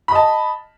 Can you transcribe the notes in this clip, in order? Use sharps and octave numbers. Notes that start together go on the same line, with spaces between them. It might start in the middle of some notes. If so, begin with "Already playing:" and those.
D#5 A5 B5